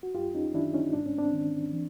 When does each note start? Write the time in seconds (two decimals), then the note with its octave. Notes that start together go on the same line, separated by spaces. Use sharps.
0.03 F#4
0.14 F#2 F4 G4
0.34 C#4 D#4
0.54 D#3 D4 E4
0.74 C#4 D#4
0.93 G#2 D4
1.06 C#4
1.18 C4 D4
1.33 D#3
1.73 E3